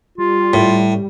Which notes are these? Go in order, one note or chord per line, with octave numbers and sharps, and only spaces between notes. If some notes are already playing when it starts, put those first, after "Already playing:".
G3 F4
A2